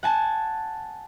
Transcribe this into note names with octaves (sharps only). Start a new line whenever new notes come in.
F#5 G#5 A5